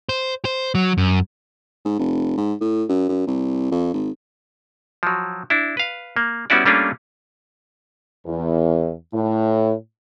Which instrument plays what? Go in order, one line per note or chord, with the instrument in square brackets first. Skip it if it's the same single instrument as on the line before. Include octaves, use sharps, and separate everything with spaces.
[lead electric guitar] C5
C5
F#3
F#2
[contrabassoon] G#2
F1
G#2
A2
F#2
F#2
C2
F2
G#1
[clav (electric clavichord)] F3 F#3
D4 E4
B4 F5
A#3
G3 B3 C#4 E4 F#4 D5
G3 A3 A#3 C#4 D4 F4
[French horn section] E2
A2